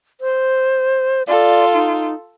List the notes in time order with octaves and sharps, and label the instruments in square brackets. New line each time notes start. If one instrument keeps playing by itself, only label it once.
[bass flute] C5
[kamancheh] F4 A4 [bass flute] D5
[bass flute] D#4